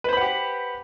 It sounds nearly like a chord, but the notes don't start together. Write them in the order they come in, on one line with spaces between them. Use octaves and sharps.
B4 C5 B5 F#5 G4